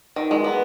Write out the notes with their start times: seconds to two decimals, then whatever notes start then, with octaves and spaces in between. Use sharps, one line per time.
0.16 D#3
0.31 G#3
0.44 B3